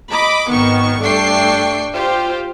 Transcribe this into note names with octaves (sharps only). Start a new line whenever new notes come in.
D#5 B5 D6
G#1 D#3 B3 C#6
G2 A3 D4 G5 C#6 C7
F4 G4 C5